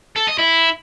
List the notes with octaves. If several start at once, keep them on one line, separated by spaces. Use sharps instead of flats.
A4
D#5
E4